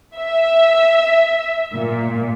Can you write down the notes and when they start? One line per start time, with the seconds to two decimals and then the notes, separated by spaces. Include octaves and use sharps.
0.17 E5
1.73 A#2